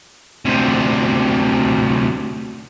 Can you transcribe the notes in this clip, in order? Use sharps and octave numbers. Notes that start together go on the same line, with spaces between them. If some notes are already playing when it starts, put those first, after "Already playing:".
D2 C3